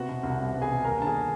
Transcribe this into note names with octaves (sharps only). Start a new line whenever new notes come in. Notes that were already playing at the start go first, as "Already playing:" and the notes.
Already playing: C3 B3 F#4 F#5
B2
C2
G3
B3
G#4 G#5
B2
D#2 A#4 A#5
D3 A5
G#4 G#5